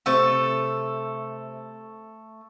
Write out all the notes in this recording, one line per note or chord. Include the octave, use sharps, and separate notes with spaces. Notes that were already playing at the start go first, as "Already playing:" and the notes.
C3 A3 A4 C5